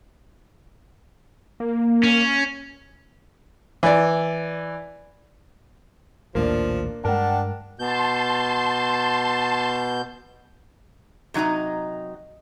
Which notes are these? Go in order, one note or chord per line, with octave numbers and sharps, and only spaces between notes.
A#3
C#4
E3 D5
A#1 D#2 A2 F3 A#3 D4
G2 G#3 D4 A#4 F#5 G5 A5
B2 A5 C6 G6
C3 F#3 D#4 D#5 A#5